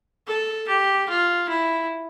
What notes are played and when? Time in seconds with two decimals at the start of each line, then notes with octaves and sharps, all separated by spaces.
0.27 A4
0.68 G4
1.09 F4
1.49 E4